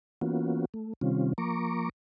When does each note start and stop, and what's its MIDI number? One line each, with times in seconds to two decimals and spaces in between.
0.21 0.65 52
0.21 0.65 58
0.21 0.65 59
0.21 0.65 61
0.21 0.65 65
0.21 0.65 66
0.74 0.93 57
1.01 1.33 48
1.01 1.33 51
1.01 1.33 55
1.01 1.33 60
1.01 1.33 61
1.01 1.33 65
1.38 1.89 53
1.38 1.89 58
1.38 1.89 82
1.38 1.89 85
1.38 1.89 86